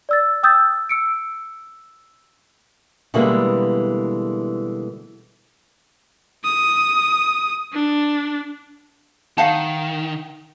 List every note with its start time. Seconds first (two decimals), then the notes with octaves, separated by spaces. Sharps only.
0.09 D5 E6 A6
0.43 G5 D#6 E6 G6 A6
0.89 E6 C#7 D7
3.14 B2 D3 E3 G3 G#3 A#3
6.44 D#6
7.73 D4
9.38 D#3 F5 F#5 A5